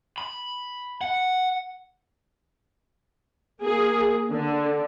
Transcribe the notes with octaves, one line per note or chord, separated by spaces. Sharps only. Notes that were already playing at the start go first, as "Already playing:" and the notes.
B5
F#5
A#3 G#4
D3